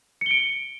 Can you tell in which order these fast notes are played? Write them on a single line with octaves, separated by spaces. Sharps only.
C#7 G7 D7